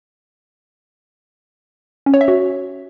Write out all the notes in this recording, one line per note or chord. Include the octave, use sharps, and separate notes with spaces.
C#4
C#5
E5
F#4